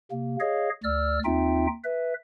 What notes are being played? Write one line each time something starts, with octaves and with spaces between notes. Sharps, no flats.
C3 A#3
G#4 C#5 D#5 F5
D2 D5 E6 F6
D#2 C4 D#4 F4 E5 G5
B4 E5